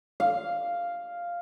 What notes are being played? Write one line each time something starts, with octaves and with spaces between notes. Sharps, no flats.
F5